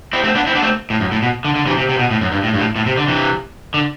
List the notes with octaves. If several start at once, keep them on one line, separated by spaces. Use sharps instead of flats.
C4 E4
A3 C4
B3 D4
C4 E4
B3 D4
A3 C4
A2
F#2
A2
B2
D3
D3
C3 E3
C3
C3
B2
A2
F#2
G2
A2
G2
A2
A2
C3
D3
C3 E3
D3